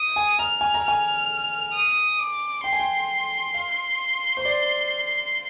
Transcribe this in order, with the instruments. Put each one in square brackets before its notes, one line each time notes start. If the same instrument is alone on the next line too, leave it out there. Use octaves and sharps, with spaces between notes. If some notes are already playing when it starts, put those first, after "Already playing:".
Already playing: [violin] D#6
[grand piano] G#5
[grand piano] A#5 [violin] F6
[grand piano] G#5
A#5
[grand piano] G#5 [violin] F6
[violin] D#6
D6
[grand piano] G5 [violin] C6
[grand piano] G#5
G5
F5
C5
D5